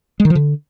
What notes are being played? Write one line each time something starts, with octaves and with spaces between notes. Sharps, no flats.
G#3
D#3
F3
D3